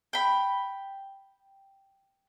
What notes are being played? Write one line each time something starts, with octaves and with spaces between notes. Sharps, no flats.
G5 B5